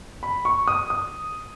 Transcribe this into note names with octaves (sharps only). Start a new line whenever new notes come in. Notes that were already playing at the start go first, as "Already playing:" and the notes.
B5
C#6
D#6
D#6